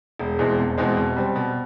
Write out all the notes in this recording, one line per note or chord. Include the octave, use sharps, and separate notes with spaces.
E1
E2 B2 G#3 C4
E1
E2 B2 G#3 C4
B2
G3 C4
B2